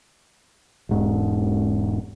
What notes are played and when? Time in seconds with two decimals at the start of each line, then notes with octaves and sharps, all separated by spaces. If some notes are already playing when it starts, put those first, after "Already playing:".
0.89 E1 G#2